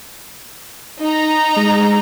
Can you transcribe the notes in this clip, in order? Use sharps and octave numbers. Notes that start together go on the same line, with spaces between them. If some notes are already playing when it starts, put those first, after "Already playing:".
D#4 A#5
G#3